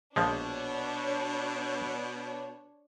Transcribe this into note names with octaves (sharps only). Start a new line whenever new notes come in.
A#1 B2 F3 G#3 D4 C#5